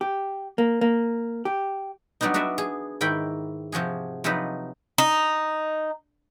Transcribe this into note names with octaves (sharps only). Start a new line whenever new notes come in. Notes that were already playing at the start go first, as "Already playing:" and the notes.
G4
A#3
A#3
G4
F#3 G3 B3 D4 D#4
D4 F#4 B4 D5 E5
G#4
G#2 D#3 E4 G5 B5
C3 F3 F#4 G#4
C3 F3 F#3 D#4 B4 B5
D#4